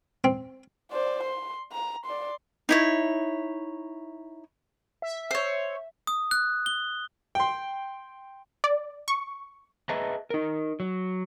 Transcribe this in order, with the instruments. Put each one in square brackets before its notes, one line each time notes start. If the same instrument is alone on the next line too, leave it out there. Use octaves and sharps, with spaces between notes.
[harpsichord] C4
[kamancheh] C5 D5
C6
A#5
D5 C6
[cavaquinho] D#4 E4 C#5
[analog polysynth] E5
[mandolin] C5 C#5
[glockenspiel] D#6
F#6
G7
[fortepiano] G5 C6
[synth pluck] D5
C#6
[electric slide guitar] G#4 B4 D#5 E5 A5 A#5
D#4 A#4
F#3